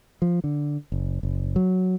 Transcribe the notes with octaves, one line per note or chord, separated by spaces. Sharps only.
F3
D3
F#1
F#1
F#3